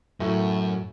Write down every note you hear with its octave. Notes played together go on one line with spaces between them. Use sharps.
F#2 A2 F#3 A3